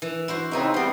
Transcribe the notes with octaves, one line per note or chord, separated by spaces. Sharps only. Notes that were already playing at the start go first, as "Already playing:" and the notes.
E3
E4 F#4 C5
C#3 C4 D#4 G#4 B4 E5
G3 B3 C4 C5